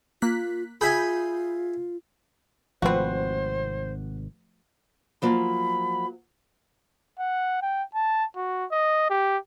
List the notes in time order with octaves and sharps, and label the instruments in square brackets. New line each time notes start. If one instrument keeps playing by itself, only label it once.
[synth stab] A#3 F#6 B6 [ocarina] F4
[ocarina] F4 [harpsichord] G#4 E5 G#5 [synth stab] B5 D#6 G6
[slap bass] G#1 C3 [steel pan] F3 A3 B4 [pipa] C4 F#4 [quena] C5
[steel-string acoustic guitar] F3 F#3 A#3 [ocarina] B5
[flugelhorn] F#5
G5
A5
F#4
D#5
G4